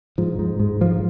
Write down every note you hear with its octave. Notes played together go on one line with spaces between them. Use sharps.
G#2 F3
G#2
G#2
G#2 F3